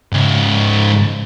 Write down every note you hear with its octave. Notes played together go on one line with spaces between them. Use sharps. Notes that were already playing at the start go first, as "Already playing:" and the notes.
G#2 C#3